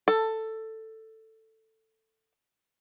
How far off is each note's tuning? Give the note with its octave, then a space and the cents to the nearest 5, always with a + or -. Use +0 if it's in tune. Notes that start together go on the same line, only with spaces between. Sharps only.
A4 +10